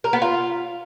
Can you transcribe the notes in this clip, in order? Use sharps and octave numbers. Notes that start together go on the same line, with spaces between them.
A#4
B3
F4